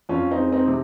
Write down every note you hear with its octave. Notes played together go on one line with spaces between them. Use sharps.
F2 C#4 F4
C4 D#4
G#3
C4 D#4
C3